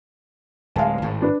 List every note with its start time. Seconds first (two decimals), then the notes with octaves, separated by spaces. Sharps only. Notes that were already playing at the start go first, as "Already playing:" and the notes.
0.76 D1 G#3 F5 G#5 A5
1.02 G#1 A2
1.22 D4 B4